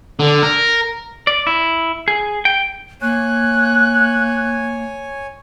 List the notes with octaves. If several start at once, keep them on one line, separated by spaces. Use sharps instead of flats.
D3
A#4
D5
E4
G#4
G5
A#3 C#5 G#5 F#6